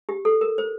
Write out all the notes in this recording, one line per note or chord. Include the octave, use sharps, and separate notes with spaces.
G4
A4
A#4
C5